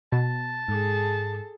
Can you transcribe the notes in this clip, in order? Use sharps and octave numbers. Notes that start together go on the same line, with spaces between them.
B2 A5
G#2 G#4 A4